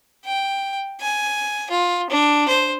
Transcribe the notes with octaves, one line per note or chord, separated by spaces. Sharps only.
G5
G#5
F4
D4
C5